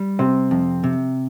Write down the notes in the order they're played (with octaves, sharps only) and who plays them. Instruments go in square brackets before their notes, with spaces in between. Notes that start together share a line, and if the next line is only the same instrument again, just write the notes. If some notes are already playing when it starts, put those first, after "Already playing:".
Already playing: [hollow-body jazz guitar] G3
[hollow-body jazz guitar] C3 [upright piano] C4
[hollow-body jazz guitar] F2
C3